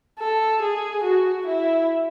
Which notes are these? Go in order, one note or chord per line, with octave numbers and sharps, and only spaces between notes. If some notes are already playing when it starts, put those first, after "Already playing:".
A4
G#4
F#4
E4